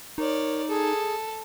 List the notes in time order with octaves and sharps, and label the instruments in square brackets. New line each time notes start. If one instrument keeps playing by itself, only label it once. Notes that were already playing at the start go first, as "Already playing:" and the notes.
[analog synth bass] D#4 [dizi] A#4 [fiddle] C#5 D5
[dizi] G#4 [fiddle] A4